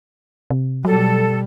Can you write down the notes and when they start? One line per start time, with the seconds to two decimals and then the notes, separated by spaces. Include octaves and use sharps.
0.50 C3
0.85 B2 F#3 G3 A4